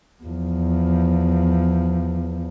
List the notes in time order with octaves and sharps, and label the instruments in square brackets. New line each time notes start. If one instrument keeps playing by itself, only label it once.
[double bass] E2 F3